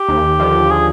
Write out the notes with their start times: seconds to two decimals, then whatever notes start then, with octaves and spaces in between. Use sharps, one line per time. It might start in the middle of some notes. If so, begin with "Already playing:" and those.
Already playing: G4
0.08 D#2
0.39 D3 F3
0.71 G#4